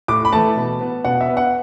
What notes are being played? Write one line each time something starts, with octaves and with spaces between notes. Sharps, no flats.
A2 D6
B5
E3 A3 A5
B2
B3
B2 F#5
E5
B3
F#5